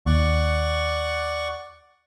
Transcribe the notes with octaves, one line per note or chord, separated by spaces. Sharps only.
D#2 D5 F#5 C#6